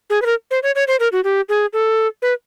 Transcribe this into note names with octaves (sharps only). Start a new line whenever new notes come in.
G#4
B4
A#4
C5
C#5
C#5
C5
A#4
F#4
G4
G#4
A4
B4